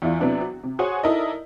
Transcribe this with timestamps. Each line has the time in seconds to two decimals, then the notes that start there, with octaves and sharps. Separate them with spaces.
0.02 E2 E4 F4 D5
0.20 C3 F#3 B3 D4 E4
0.41 F#4
0.63 C3
0.79 F#4 G#4 C5 C#5 F#5 G#5
1.03 D#4 E4 A4 A#4 D5 D#5